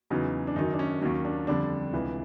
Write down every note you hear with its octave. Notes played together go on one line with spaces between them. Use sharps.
E2 C#3 F#3 D#4
D4
F#2 D#3 F#3 D#4
D4
C#4
D#2 D#3 F#3 C#4
D4
F2 D3 G3 D4
C#2 C3 E3